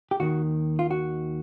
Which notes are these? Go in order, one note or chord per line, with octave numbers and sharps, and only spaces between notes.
G4
D#2 D#3 F#4
F4
F#4